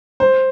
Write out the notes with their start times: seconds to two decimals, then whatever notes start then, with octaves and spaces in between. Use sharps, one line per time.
0.20 C5